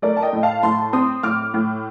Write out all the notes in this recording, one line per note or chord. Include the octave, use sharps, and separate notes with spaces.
A3 A#4 D5
A5
D#5 G5
A2
F5 A5
A2 A5 C6
C4 C6 D#6
A2 D6 F6
A2